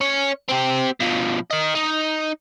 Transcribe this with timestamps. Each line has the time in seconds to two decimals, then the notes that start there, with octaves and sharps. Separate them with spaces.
0.01 C#4 C#5
0.49 C4 G4
1.00 B2 F3
1.51 A#4 D#5
1.75 D#4